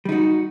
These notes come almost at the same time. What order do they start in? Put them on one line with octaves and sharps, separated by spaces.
G3 D#4 F#4